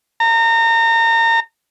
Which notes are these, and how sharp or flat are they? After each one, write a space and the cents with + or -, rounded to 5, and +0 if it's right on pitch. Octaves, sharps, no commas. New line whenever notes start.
A#5 -30